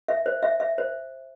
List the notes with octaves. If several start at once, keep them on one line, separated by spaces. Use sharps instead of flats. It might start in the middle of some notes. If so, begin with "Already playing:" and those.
E5
C5
E5
E5
C5